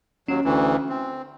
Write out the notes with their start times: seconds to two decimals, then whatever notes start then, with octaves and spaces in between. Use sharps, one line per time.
0.28 D#2 F#3 C#4
0.45 D2 E3
0.89 C4